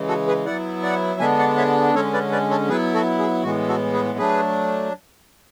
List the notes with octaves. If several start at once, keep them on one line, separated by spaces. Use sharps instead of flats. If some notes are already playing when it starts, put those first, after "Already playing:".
Already playing: C#3 E3 G#3
F#4 A4
G#4 B4
F#3 B3 E4 D5 F#5
D5 F#5
D3 G#3 B3 D4 E5 G#5
D5 F#5
C#5 E5
D3 G#3 C#4 A4 C#5
B4 D5
B4 D5
A4 C#5
F#3 B3 E4 G#4 B4
F#4 A4
G#4
A2 E3 G#3 B3 F#4
F#4 A4
G#4 B4
F#3 A3 D4 G#4 B4